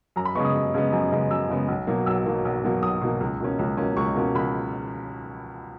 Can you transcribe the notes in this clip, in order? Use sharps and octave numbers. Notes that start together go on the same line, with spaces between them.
F#2 A#5
B5
C#3 G#3 B3 C#6
D#6
F#2
C#3 G#3 B3
F#2
C#3 G#3 B3
F#2 E6
C#3 G#3 B3
B1
B2 F#3 A#3
B1 E6
B2 F#3 A#3
B1
B2 F#3 A#3
B1 D#6
B2 F#3 A#3
C#2
B2 A#3 C#4
C#2
B2 A#3 C#4
C#2 C#6
B2 A#3 C#4
C#2 B5